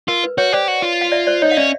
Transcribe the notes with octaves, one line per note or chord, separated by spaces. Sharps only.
F4 A#4
B4
F#4 B4 C#5
G4 C5 D5
F#4
F4
F5
D5 E5
C5 D5
D#4 C#5 D#5
F5
C#4 D5 E5